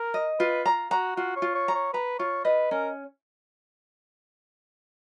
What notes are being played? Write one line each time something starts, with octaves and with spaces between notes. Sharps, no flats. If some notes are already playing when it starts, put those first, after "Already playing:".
Already playing: A#4
D#5
F4 B4
A#5
F#4 A#5
F4 F#4
C#5
F4
C#5
A#5
C#5
B4 A#5
F4 C#5
B4 D#5
C#4 A#4